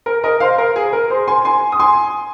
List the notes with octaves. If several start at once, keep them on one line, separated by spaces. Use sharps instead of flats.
A#4
A#4 D#5
C5 F5
A#4
G#4
A#4
G#4 C5
G#5 C6
G#5 C6
D#6
G#5 C6